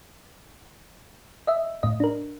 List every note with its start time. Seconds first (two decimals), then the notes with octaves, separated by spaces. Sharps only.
1.47 D#5 E5
1.83 A2 D#5
2.00 D4 A#4